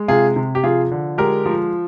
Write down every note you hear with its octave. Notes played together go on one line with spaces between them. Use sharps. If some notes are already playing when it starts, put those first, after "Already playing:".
Already playing: G#3
C3 F4 G#4
C3
G4
F3 F4 G#4
D3
G#3 G4 A#4
F3